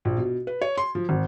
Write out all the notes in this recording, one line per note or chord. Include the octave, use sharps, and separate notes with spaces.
A#1
B2
B4
C#5
C6
F3
G#1